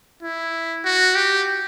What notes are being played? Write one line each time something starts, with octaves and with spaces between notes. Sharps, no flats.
E4
F#4
G4